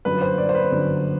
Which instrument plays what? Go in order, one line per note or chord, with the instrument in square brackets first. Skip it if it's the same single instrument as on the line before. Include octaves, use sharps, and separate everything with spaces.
[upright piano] G1 F#2 D3 F#3 B4
C5
D5
C5
B4
G1 F#2 D3 F#3